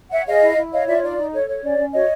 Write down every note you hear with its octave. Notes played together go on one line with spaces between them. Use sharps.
C#5 E5 F#5
G#4 D#5 F5
E4
E4
C#5 D#5 F5
F4 D5 E5
C#5
D#4 D5
D#4
A4 C#5
C#5
C#4 D5
C#4
F#4 C#5 D#5